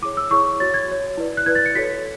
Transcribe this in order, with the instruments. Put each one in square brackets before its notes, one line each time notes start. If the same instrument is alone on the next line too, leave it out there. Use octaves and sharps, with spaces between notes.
[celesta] E4 G#4 C#5 D6
E6
E4 G#4 C#5 C#6
F#4 C#5 A6
G#6
F#4 C#5
E4 B4 D5
F#6
E4 B4 D5 G#6
A6
C#7
F#4 A4 C#5 B6